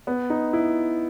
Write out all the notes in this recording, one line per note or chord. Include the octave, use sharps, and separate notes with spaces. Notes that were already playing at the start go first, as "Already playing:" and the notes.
B3
D#4
E4